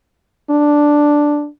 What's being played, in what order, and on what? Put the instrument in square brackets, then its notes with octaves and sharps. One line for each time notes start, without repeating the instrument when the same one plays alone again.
[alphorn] D4